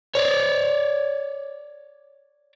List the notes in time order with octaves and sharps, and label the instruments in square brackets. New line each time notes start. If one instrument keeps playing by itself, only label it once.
[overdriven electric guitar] C#5 D5